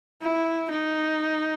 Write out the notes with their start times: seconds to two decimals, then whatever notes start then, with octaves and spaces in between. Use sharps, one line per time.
0.22 E4
0.71 D#4